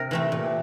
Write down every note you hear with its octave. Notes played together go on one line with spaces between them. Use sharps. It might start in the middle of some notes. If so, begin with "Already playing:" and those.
Already playing: C3 A#4
E3 A3 C4
A#2